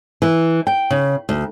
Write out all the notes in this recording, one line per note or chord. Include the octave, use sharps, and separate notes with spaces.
E3
G5
C#3
D2